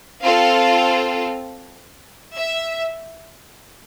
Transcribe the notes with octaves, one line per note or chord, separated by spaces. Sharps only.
C4 F4 A4 F5
E5